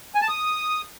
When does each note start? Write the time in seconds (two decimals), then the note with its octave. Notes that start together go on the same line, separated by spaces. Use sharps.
0.15 G#5
0.22 A5
0.28 D#6